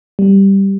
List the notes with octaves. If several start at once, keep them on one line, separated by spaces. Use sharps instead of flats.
G3